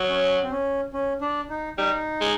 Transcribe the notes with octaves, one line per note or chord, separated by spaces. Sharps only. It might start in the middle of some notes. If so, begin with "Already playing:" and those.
Already playing: F#3
C#4
C4
C#4
C#4
D4
D#4
G3 D#4
G#3